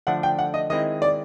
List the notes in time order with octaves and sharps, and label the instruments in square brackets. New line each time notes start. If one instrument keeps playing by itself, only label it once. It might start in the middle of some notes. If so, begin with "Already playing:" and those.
[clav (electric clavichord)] D3 F3 A3 D4 [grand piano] F#5
[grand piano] G5
F#5
D#5
[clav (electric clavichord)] D#3 G#3 C4 E4 [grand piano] D#5
[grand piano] D5